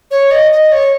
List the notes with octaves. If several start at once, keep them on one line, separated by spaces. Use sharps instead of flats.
C#5
D#5
D#5
C#5